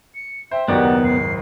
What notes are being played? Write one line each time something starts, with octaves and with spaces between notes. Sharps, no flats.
C#7
C5 E5 G5
F#1 D#2 B3 D#4 F#4 G4 D5 F#5
G#2 C7